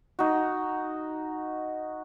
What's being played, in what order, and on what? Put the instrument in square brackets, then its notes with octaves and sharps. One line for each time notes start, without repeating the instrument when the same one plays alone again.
[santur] D#4 F#4